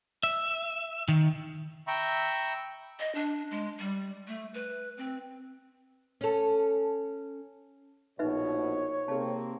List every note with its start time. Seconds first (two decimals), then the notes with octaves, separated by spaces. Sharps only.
0.23 E5
1.08 D#3
1.87 E5 G5 A#5 B5 C#6
3.00 D#5
3.15 D4
3.51 G#3
3.79 G3
4.27 A3
4.54 B4
4.98 C4
6.21 C#4 A4
8.19 A#1 B2 D#4 B4 C#5 E5
9.08 C3 A#3 C4 G#4 A5